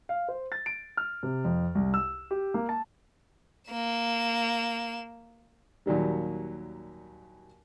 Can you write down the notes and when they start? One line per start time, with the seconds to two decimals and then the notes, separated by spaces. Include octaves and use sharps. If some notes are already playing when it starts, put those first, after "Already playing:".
0.09 F5
0.29 C5
0.52 A6
0.66 D7
0.97 F6
1.23 C3
1.45 F2
1.75 C2
1.94 E6
2.31 G4
2.54 A#3
2.69 A5
3.71 A#3 E7
5.86 D#2 A#2 F#3 G3